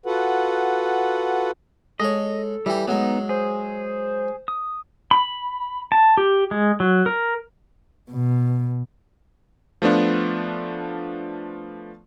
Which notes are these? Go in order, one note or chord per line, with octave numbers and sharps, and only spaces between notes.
F4 F#4 A4 B4 F#5
G#3 A4 C#5 D#5
E3 G3 G4
F#3 G#3 B3 D#4
G#4 C5
D#6
B5
A5
G4
G#3
F#3
A#4
B2
F3 A3 B3 D4 F4